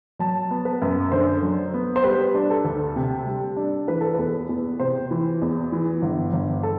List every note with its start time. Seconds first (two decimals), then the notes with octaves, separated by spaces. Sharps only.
0.19 F#3 A5
0.51 B3
0.65 B4
0.82 F#2
1.12 D3 C5
1.42 F#3
1.74 B3
1.96 C5
2.03 G3 B4
2.35 D4
2.50 A4
2.65 D2
2.96 C3
3.26 G3
3.57 D4
3.88 E3 B4
4.01 A4
4.14 E2 B4
4.49 E2
4.79 C3 C5
5.11 E3
5.42 E2
5.72 E3
6.02 G1
6.33 G1
6.63 A4